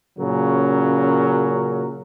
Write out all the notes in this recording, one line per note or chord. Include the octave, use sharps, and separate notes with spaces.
A#2 C#3 F#3 C#4 A#4